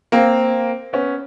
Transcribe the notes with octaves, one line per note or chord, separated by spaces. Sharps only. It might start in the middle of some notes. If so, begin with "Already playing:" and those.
A#3 C4
B3 C#4